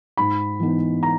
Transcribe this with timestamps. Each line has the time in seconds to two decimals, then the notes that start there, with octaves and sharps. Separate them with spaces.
0.17 G#2 B5
0.60 E3 B3 D#4
1.03 A#5